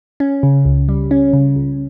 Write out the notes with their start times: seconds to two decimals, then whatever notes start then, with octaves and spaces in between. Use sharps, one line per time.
0.20 C#4
0.43 C#3
0.65 C#2
0.89 G3
1.11 C#4
1.33 C#3
1.56 C#2